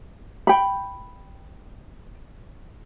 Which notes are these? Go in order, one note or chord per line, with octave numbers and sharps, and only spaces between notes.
G5 B5